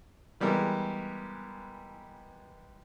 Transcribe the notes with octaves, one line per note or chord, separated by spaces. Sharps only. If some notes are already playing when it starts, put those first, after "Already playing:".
E3 G3 G#3 B3 A#4